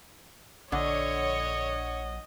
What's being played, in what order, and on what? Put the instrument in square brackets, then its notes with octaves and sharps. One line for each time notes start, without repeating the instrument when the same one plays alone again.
[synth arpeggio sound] A#1 F#5 [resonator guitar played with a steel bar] D3 [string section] C#5 [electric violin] D#5